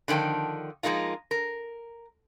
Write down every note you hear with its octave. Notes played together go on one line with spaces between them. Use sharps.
D3 D#3 F3 G5 A5
F3 G#3 A#3 D#4 F4
A#4